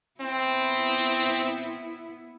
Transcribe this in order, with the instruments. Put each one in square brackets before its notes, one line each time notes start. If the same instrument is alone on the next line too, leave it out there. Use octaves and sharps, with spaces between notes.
[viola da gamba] B3 E4 [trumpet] C4